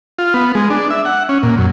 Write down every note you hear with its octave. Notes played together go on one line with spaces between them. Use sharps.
F4
B3
G#3
D4
E5
F#5
C#4
A#2
F#2